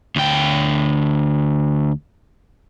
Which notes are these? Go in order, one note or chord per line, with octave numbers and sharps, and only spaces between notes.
D2 G5